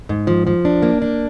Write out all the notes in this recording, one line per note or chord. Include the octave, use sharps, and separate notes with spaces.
G#2
F3
F3
D4
A#3
D4